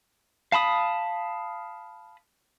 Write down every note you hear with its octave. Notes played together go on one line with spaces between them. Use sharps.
F5 A5 B5 D#6